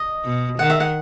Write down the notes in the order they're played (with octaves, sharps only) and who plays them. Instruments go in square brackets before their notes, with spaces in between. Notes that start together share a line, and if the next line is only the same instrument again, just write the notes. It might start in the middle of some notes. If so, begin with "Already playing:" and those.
Already playing: [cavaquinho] D#5
[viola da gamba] B2
[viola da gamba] D#3 [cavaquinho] F#5
[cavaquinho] E5
F#5